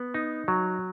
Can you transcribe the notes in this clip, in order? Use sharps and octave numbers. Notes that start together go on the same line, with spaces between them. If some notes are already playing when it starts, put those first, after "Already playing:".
Already playing: B3
D#4
F#3